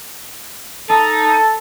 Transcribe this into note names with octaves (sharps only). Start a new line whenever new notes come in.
D#4 A4 A5